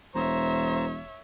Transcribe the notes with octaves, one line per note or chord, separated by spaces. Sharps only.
E1 C5 C#5 E5 A#5